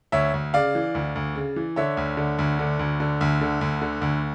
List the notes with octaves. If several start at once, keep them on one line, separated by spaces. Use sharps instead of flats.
D2 C#5 E5
D2
C#3 D5 F5
E3
D2
D2
C#3
E3
D3 C#5 E5
D2
D3
D2
D3
D2
D3
D2
D3
D2
D3
D2